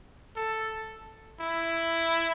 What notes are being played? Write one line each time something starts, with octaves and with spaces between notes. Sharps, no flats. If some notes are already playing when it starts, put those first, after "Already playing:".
A4
E4